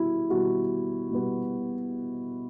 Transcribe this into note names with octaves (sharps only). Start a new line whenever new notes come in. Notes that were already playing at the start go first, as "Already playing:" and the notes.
Already playing: B2 G3 B3 E4 F#4
B2 G3 B3 F#4
B2 G3 B3